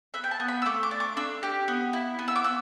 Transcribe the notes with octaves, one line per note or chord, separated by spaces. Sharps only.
B3 E5
G5
A5
B3
B5
E6
A3 D6
D6
D4
D6
D4 E6
G4
B3
E4
B3
E6
D6
B3 E6